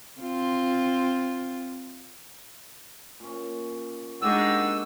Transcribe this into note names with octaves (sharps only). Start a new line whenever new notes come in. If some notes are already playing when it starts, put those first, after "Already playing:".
C4 F4
A#2 C#4
G#3 A#3 D4 D#4 F#4 G4 F#5 E6